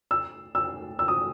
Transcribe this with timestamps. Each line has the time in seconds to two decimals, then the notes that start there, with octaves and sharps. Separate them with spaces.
0.11 E6
0.55 E6
0.99 E6
1.08 D#6